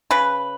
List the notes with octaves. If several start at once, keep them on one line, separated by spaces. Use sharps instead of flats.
C#3 B4